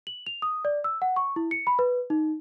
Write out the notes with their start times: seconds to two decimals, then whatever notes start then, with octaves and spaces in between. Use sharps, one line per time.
0.07 F#7
0.26 F7
0.42 D#6
0.65 D5
0.84 E6
1.02 F#5
1.16 C#6
1.36 E4
1.51 C#7
1.67 B5
1.79 B4
2.10 D#4